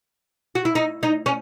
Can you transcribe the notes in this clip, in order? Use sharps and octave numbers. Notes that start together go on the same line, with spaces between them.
F#4
E4
D#4
D#4
C#4